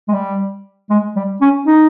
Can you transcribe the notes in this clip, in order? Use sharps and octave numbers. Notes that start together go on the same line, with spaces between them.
G#3
G3
G#3
G3
C#4
D#4